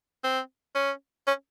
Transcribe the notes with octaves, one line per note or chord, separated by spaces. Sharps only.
C4
C#4
C#4